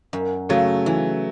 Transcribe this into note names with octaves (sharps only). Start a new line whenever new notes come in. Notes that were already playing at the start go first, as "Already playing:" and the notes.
F#2
C#3 F#3 A3
E3